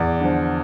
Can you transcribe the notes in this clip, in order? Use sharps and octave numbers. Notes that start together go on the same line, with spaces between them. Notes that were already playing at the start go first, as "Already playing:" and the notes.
Already playing: E2 D5
D3 F3